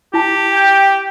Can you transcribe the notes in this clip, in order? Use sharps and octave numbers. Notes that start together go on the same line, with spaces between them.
E4 G4 A5
G5